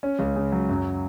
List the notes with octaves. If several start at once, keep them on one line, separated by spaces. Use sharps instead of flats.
C#4
C#2
C#3
F#3
F#2